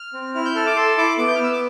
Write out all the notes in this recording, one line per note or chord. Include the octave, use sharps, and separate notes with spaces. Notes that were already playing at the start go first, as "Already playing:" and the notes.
Already playing: F6
C4
E4 F6
G6
A4 F6
D6
A4 C6
E4 D6
B3 D6
G6
F6
B3 E6
D6